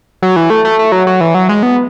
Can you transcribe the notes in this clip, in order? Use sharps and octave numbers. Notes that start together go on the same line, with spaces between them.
F#3
E3
A3
A3
A3
F#3
F#3
E3
F#3
G#3
B3